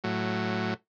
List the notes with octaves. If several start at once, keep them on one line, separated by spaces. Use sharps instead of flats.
A2 F#3